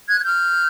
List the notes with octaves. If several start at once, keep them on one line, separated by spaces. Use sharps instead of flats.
F#6 G#6
G#6
F6 G6